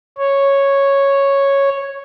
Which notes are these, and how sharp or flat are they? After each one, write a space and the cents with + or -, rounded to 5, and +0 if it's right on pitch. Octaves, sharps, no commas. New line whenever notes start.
C#5 -5